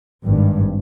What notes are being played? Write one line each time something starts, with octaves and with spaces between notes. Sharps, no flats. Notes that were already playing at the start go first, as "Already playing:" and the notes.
G#1 G2